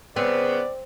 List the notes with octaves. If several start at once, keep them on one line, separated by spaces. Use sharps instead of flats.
C#3 B3 C4 D5